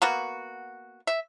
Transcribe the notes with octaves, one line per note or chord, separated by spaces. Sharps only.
A#3 B3 F#4
E5